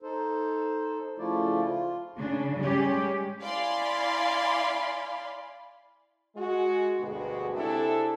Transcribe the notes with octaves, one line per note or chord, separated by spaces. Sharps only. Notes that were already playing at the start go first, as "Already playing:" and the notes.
D#4 A4 C5
C#3 F3 A3 E4 F4 D5
F4
C#3 D4
G3 G#3 C#4 G4
E4 D5 F5 G#5 B5 C6
G#3 F#4
D2 G2 B2 G#3 F#4
C3 C4 D4 E4 G#4 A4